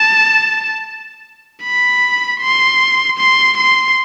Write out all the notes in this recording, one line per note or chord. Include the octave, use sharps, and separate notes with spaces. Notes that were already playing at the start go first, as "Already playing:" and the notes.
Already playing: A5
B5
C6
C6
C6